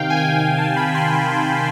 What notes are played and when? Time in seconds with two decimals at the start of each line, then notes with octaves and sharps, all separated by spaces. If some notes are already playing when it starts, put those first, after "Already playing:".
Already playing: C3 D#3 F5 G5
0.10 G#5
0.17 C3 G5
0.40 D#3 G#5
0.58 A5
0.64 D#3
0.76 B5
0.89 C3
0.95 C6
1.13 D#3
1.36 C3